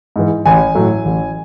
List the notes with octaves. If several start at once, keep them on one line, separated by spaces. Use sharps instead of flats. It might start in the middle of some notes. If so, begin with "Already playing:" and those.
G#2 E3
A1 G#5
A2 F#3 A3
A1